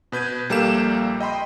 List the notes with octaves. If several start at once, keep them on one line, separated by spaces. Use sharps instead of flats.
B2 B4 G6 G#6 D#7
A#1 G3 A#3 A4 F5 E7
D#5 G5 B5 C6